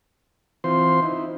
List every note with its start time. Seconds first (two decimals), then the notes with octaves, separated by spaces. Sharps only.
0.64 E3 C4 F4 C5 C6
1.03 D#4 E4